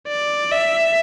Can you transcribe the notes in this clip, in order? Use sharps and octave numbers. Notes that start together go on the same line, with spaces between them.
D5
E5